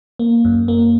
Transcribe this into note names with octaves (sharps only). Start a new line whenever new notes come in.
A#3
F#2
A#3